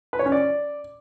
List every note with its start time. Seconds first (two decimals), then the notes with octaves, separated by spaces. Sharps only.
0.13 B4
0.19 C#5
0.26 C#4
0.32 D5